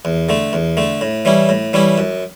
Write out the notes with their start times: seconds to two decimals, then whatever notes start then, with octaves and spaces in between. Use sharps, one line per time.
0.05 E2
0.29 D3 A3
0.53 E2
0.77 D3 A3
1.01 A2
1.25 E3 G3 C#4 E4
1.49 A2
1.73 E3 G3 C#4 E4
1.98 F#2